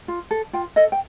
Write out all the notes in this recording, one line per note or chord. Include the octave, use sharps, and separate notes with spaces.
F4
A4
F4 G5
A4 D#5
G5